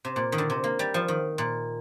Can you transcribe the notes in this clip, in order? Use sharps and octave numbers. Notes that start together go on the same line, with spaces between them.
C3
A#2
D#3
D3
C3
A#3
G3
F3
D#3
A#2